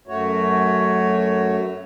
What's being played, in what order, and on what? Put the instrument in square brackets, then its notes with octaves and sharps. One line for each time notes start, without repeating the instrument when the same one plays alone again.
[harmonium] F#2 A3 F#4 C#5